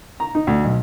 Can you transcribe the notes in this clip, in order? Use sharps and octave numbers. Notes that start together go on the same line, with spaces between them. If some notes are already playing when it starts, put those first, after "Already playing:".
A#5
D#4
D2
B1